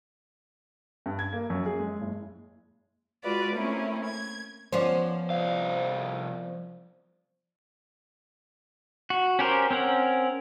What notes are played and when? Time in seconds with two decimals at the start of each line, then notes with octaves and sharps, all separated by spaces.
1.06 G2
1.19 G#6
1.33 A#3
1.50 F#2
1.66 G#4
1.80 G#3
2.01 F#1
3.23 G#3 F4 F#4 B4 D5
3.55 A3 A#3 C4 C#4 E4
4.04 G#6
4.72 F3 B3 C#4 C5 D5
5.30 C2 F5
9.10 F#4
9.39 C#4 G4 A#4 C5
9.71 C4 C#4 A#4 F#5